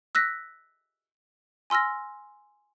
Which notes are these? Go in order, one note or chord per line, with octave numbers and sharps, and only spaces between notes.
E6 F#6 A#6 B6
G#5 C6 E6 F6 A#6